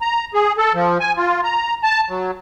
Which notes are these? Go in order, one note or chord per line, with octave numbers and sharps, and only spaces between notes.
A#5
G#4
A4
F3
G#5
F4
A#5
A5
F#3